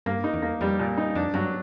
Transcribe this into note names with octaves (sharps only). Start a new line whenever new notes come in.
G2 A#3
D#4
E2
A#3
F2 G3
A#2
D#4
F2 D4
G2 F#3